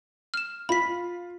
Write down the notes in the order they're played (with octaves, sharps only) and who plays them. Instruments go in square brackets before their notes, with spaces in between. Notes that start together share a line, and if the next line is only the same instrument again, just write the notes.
[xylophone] F6 E7
[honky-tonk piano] F4 [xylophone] B5 B6